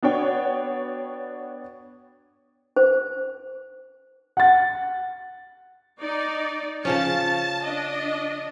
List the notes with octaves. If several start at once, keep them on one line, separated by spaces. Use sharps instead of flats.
B3 D4 F#4 C#5 G5
C5
F#5 A6
D#4 D5
C#3 F3 C#4 A5
D4 D#5